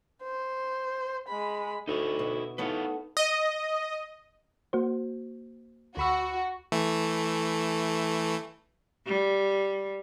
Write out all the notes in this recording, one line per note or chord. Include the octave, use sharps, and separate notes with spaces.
C5
G#3 B5
D2 D#4 E4 C#5
B2
E3 A3 B3 D#4 B4 C#5 F5
D#5
A#3 F#4 C5
D2 F#4 B5 E6
E3 A3
G3